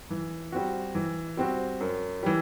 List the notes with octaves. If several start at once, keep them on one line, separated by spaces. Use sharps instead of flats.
E3
G3 C4 F#4
E3
G3 C4 F#4
F#2
E3 G3